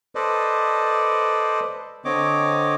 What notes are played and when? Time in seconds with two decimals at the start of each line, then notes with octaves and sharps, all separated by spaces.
0.15 A4 B4 C5 D5 D#5
2.05 D3 C4 C#5 D#5 D6